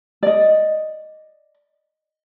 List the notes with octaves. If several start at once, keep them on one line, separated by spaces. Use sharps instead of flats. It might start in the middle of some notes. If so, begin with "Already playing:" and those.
D5 D#5